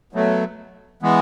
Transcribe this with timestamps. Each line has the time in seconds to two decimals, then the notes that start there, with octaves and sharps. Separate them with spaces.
0.13 B2 F#3 A3
1.02 E3 G#3 B3